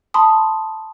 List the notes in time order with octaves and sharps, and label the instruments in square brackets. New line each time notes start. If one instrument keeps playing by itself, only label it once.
[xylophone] A5 B5 C6 D#6